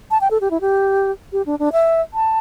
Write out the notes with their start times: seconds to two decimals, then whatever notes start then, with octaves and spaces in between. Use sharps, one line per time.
0.11 A5
0.21 G5
0.31 A4
0.41 G4
0.51 E4
0.61 G4
1.32 G4
1.46 D4
1.59 D4
1.72 E5
2.13 A5